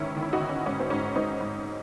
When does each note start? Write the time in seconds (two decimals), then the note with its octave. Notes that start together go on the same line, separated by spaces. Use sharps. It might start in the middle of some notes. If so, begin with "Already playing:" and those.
Already playing: G#2 D#3 C#4 E4
0.16 D#3
0.22 E4
0.33 D#4 F#4
0.40 D#3
0.49 C#4
0.66 G#2 C#4
0.80 C4
0.90 G#2 C#4
1.16 G#2 C4 D#4
1.41 G#2